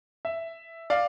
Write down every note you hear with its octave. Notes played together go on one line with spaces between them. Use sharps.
E5
D5 F5